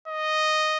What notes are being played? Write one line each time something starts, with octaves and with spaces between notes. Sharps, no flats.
D#5